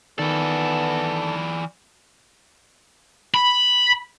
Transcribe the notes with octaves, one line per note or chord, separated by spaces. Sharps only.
D#3 E3 B3 A4 D5
B5